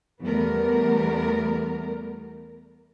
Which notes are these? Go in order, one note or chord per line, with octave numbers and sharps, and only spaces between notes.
E2 G3 A3 B3 A#4